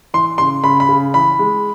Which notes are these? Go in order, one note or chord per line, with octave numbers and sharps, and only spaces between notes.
E3 C6
C#3 C6
C#3 B5
B5
C#3
E3 B5
G#3